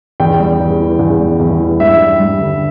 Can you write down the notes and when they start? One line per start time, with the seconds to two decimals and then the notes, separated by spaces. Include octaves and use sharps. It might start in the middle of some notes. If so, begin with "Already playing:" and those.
0.20 E2 G5
0.40 G3
0.60 E2
0.80 E3
0.99 E2
1.20 G3
1.40 E2
1.60 E3
1.79 G2 E5
2.00 G3
2.20 G2
2.40 D3